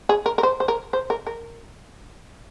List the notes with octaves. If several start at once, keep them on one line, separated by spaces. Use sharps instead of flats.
G#4
A#4
A#4
C5
C5
A#4
C5
A#4
A#4